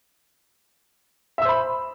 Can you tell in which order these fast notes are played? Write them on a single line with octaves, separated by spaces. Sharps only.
E5 E6 C5 B5